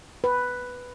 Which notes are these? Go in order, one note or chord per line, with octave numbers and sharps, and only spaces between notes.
B4